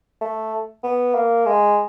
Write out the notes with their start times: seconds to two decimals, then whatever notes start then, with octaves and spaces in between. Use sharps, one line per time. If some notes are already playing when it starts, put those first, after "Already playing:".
0.21 A3
0.84 B3
1.14 A#3
1.46 G#3